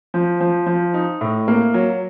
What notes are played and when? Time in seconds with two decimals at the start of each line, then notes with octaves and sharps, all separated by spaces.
0.14 F3
0.41 F3
0.66 F3
0.94 D#4
1.21 A2
1.48 A#3
1.74 F#3